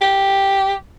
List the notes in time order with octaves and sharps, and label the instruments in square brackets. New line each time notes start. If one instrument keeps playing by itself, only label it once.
[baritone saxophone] G4